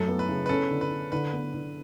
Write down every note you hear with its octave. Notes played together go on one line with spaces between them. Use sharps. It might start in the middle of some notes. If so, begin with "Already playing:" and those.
Already playing: F#2 A3 A4
B3
B4
C#3
B4
C#4 A4
D3
B4
D3
D3 B4
B3
D3